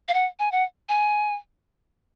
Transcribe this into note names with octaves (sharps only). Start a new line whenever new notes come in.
F5
F#5
G#5
F#5
G#5